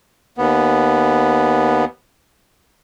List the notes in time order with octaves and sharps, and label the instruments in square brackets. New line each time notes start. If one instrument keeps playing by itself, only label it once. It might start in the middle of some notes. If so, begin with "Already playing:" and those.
[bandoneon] D#2 B3